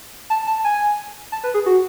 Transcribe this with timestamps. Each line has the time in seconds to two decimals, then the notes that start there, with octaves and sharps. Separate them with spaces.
0.30 A5
0.47 A5
0.64 G#5
1.32 A5
1.44 B4
1.54 G#4
1.66 F#4